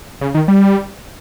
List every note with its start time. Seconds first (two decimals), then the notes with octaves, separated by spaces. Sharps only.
0.21 C#3
0.35 D#3
0.48 G3